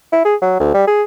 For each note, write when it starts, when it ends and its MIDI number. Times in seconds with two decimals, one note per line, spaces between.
0.12 0.23 64
0.25 0.35 68
0.42 0.58 54
0.60 0.73 38
0.74 0.85 55
0.87 1.03 68